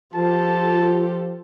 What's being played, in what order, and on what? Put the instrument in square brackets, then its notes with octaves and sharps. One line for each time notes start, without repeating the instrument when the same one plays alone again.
[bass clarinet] F3 [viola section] F4 G4 A4 [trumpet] A5